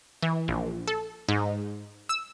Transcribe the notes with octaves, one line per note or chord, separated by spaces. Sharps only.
E3
A#1
A4
G#2
E6